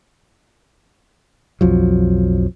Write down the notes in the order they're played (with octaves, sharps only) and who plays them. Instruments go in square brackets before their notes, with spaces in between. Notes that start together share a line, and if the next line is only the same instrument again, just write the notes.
[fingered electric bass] B1 F2 F3 F#3